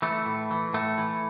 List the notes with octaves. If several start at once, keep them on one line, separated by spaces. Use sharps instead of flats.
E3 A3
A2
E3
A2 A3
E3